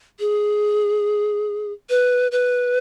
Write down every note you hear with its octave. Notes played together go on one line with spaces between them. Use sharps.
G#4
B4
B4